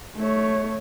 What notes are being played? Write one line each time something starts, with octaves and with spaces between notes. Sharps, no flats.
A3 C#5